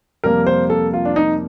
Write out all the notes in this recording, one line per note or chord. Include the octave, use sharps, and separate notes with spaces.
F2 C3 G3 A#3 A#4
C5
A4
F4
D4
D#4